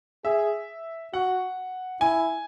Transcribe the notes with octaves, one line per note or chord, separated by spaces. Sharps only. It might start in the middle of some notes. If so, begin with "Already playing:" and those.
G#4 E5
F#4 F#5
E4 G#5